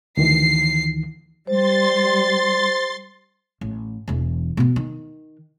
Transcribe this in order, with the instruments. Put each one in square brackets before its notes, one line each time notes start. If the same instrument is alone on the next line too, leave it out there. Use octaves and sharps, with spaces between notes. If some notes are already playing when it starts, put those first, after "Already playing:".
[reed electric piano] D2 D#3 E3 [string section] C7
[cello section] G3 [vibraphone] C5 [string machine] C6 A6
[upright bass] A1
E1 E3
B2 B3
D#3